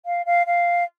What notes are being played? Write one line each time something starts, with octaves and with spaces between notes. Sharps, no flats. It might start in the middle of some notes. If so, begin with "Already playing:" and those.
F5
F5
F5